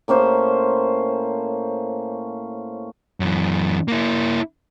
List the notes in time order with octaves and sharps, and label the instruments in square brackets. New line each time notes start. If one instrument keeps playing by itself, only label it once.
[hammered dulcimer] A2 A#3 C#4 C5
[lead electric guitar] F#2 E3
A#3 E4